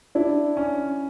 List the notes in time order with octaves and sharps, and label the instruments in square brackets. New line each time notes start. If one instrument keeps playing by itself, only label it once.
[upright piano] D4 [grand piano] E4
[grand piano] C#4